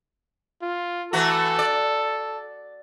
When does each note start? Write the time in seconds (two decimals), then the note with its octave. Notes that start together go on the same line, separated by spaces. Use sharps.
0.62 F4
1.13 E3 A3 F#4 A4
1.59 D5